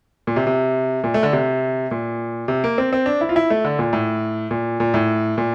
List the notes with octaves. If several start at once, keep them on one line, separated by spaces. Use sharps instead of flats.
A#2
C3
C3
A#2
A3
D3
C3
A#2
C3
A#3
C4
C4
D4
E4
F4
E4
A3
D3
A#2
A2
A#2
A#2
A2
A#2